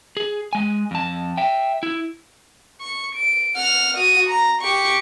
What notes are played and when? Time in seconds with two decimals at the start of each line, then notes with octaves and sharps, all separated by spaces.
0.17 G#4
0.53 G#3 G#5
0.91 F2 A5
1.37 E5 G5
1.83 E4
2.81 C#6
3.16 D7
3.56 F#5 F6
3.97 F#4 D#6
4.30 A#5
4.62 G4 C#6